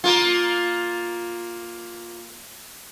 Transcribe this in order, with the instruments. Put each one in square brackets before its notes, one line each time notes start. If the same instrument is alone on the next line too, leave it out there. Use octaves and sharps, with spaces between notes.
[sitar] A#3 F4